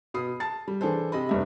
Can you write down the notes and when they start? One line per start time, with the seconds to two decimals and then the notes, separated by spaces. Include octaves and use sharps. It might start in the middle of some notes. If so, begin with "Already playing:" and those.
0.14 B2 B5 D#6 C7
0.40 A5 A6
0.68 G3
0.81 E3 D4 G#4 A4 C5
1.12 C3 D#5 B5
1.29 F1 G2 E5